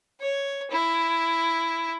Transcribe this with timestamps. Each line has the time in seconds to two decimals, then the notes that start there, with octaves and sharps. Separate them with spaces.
0.21 C#5
0.71 E4